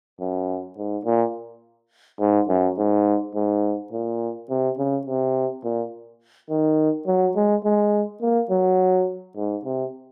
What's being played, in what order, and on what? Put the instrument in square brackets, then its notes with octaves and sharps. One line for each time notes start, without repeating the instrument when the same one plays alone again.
[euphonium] F#2
G#2
A#2
G#2
F#2
G#2
G#2
A#2
C3
C#3
C3
A#2
D#3
F#3
G#3
G#3
A#3
F#3
G#2
C3